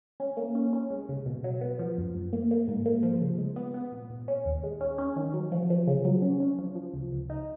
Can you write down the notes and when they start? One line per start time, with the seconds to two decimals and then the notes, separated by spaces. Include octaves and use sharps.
0.20 C#4
0.37 A#3
0.55 C#4
0.73 C#4
0.91 G#3
1.09 C#3
1.26 B2
1.44 F#3
1.61 B3
1.79 F3
1.98 F#2
2.15 F#2
2.33 A#3
2.51 A#3
2.68 G#2
2.86 A#3
3.03 F3
3.21 C#3
3.38 G#3
3.56 B3
3.74 B3
3.92 A#2
4.10 A#2
4.28 C#4
4.45 D#2
4.63 G#3
4.81 C#4
4.98 C#4
5.16 D#3
5.33 F#3
5.52 F3
5.70 F3
5.87 C#3
6.05 F#3
6.22 C#4
6.40 C#4
6.59 F3
6.75 F3
6.94 C#2
7.12 C#2
7.30 D#4